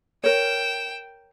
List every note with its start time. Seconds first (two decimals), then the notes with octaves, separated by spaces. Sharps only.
0.24 A#4 C#5 G5 E7